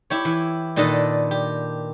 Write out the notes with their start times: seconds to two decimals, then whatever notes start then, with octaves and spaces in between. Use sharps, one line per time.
0.10 E4 G4 C#5
0.25 E3
0.76 A#2 D#3 D4 A4 B4 D#5
1.31 G4